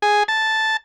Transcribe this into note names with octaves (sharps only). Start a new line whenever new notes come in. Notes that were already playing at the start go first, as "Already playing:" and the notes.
G#4
A5